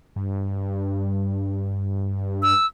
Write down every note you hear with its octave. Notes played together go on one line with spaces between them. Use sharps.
G2
E6